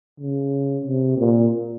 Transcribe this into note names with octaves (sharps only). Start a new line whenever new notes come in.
C#3
C3
A#2